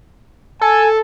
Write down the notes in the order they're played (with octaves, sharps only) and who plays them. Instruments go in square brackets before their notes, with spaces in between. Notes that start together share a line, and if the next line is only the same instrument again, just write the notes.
[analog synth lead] A4 [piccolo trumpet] G#5